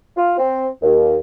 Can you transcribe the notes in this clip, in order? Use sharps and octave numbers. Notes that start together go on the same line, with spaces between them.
F4
C4
D#2